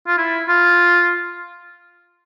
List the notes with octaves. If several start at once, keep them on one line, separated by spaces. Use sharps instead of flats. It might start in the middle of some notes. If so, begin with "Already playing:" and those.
F4
E4
F4